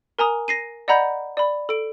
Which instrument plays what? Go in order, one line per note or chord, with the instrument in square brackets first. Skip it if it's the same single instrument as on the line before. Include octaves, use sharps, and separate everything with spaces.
[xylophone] A#4 G#5 A#5 D#6
A#6 C7 D#7
D5 D#5 F#5 A#5 B5 G6
D5 B5
A4 D7